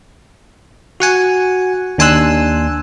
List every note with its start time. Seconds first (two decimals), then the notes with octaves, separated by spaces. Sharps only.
1.00 F#4 F#5 G#5
1.98 D#2 D4 G#5 C6 E6 F#6